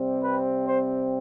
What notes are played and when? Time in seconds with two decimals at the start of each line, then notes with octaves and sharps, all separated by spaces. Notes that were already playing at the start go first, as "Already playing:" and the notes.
Already playing: C3 G3 C4
0.23 B4
0.65 C5